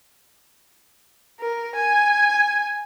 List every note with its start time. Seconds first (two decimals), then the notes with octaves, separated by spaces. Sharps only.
1.40 A#4
1.75 G#5